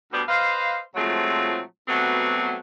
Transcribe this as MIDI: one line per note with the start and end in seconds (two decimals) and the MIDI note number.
0.12 0.22 38
0.12 0.22 47
0.12 0.22 55
0.12 0.22 59
0.12 0.22 72
0.12 0.22 74
0.29 0.78 71
0.29 0.78 72
0.29 0.78 75
0.29 0.78 77
0.95 1.60 46
0.95 1.60 53
0.95 1.60 54
0.95 1.60 56
0.95 1.60 57
0.95 1.60 60
1.89 2.55 47
1.89 2.55 54
1.89 2.55 55
1.89 2.55 57
1.89 2.55 59
1.89 2.55 60